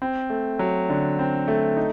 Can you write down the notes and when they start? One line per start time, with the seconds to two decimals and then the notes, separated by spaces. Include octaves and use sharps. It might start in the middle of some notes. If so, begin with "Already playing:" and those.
0.02 C4
0.30 A3
0.59 F#3
0.90 D3
1.19 C4
1.48 A3
1.77 D#4